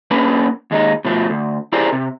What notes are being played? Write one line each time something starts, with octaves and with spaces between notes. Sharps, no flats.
A#3 C#4 D4 G#4 B4 D5
D#2 G#3 D4 D#4
B2 F3 A3
D2
E4 G4 G#4 A#4 C5 D5
C3